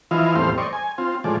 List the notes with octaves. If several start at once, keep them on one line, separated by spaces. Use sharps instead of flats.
E3 F3 E4 D#5 F5
E2 A2 G3 C4 C5 F5
C5 D5 D#5 C#6
G#5
C4 F4
A2 F3 G#3 D5